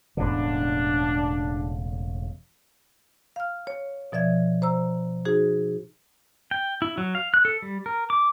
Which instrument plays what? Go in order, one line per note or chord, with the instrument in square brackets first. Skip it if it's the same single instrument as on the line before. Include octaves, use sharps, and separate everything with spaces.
[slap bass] E1 A2 C#3 [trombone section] D4
[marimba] F5 F6
C#5
B2 F3 D5 E5 G#6
C5 A#5 E6
D#4 F#4 G#4 C5
[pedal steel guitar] G5
E4
F#3
F5
F#6
A4
G3
A#4
D6